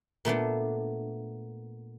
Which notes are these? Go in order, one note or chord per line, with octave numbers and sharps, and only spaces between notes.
A#2 A3 B3 D4